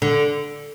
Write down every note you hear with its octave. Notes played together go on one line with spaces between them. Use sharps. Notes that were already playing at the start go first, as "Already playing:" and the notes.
D3